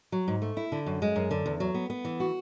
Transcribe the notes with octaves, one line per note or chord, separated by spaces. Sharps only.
F#3
G#2
A3
E4
D3
F#2
G#3
F#2
D3
E2
F#3
B3
B3
E3
F#4